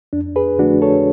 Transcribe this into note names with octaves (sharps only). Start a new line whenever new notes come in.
F2 D4
G#4 B4
D3 F3 A3 D4 F#4
A4 C#5